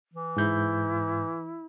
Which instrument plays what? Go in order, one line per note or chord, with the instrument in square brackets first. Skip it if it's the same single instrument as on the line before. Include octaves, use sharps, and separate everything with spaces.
[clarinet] E3
[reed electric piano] G#2 G6 [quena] E4